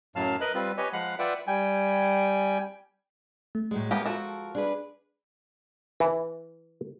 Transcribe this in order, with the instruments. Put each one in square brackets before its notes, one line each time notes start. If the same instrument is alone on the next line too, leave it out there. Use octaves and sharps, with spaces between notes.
[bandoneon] F#2 A2 F#3 F5 A5 F6
A#4 B4 D#5 B5 F#6
G3 C4 F4 B4
G4 B4 C#5 D#5 G#5
F3 G#3 F5 F#5 B5 F#6
F4 B4 D5 E5 F#5 G5
[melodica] G3 G5 G#5
[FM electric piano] A3
[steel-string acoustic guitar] A2 F#3 G#3
[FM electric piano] G#3 [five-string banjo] A#3 B3 G4 [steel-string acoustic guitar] E4
[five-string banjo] F3 F#4 A4 [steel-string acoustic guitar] A#4
[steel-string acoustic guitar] D4 G#4 B4
[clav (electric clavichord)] E3